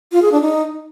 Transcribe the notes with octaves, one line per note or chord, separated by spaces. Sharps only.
F4
G#4
D4
D#4